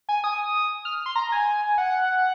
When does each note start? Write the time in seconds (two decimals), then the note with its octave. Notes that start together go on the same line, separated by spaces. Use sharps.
0.09 G#5
0.24 D#6
0.85 F6
1.06 C6
1.16 A#5
1.32 G#5
1.78 F#5